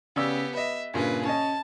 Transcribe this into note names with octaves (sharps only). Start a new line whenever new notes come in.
C#3 B3 G4 D5 E6
B4 D#5 E5
G2 A#2 C#3 G#4 B4
C#4 D#5 A5